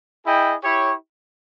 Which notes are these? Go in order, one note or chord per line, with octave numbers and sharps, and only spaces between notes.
E4 G#4 D#5 G5
E4 G4 C#5